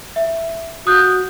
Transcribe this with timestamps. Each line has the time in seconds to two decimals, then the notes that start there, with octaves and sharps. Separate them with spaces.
0.16 E5
0.87 F#4 D#6 F#6 G6